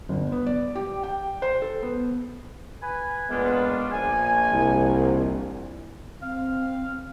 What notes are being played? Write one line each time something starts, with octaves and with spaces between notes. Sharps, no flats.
G1
B3
D5
G4
G5
C5
A4
B3
B4 G#5
A#2 G#3 B3 C#4 D4 F4
A#1 G#5
C2
C4 F5